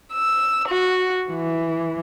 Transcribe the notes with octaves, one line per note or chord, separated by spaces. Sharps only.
E6
F#4
E3